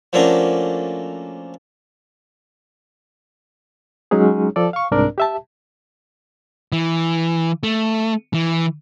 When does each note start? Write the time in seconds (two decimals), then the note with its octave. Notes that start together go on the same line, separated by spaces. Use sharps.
0.13 F3 A3 A#3 C#4 D4 F#4
4.11 F#3 G#3 C#4 D#4 G#4
4.56 F3 A4 D5
4.73 F5 C#6
4.91 C2 G#2 C4 D4 A#4 D5
5.18 G4 E5 A5
6.72 E3
7.63 A3
8.34 E3